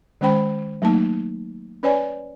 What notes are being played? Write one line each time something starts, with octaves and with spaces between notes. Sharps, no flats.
D#3 G#3 C#4 C5 G5 B5
F#3 A3 A#3 D#4 A5
C#4 B4 C#5 D5 G#5